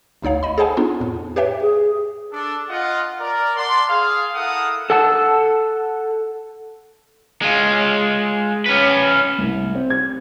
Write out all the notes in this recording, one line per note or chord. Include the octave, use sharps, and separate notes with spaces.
G1 D2 D#4 C#5 F5
D#5 B5
G#4 A4 C5 F#5 G#5 A5
B3 D4 D#4 F4
F2 A2
G4 B4 C#5 E5 G5
G#4
D4 A4
F4 D#5 F#5
A#4 D5
D5 F#5 A5 C6
G#4 F5
E4 A4 A#4 F5 F#5 D#6
A4 F#5 A5
G#3 F4
C#4 B4
C2
C4
G#6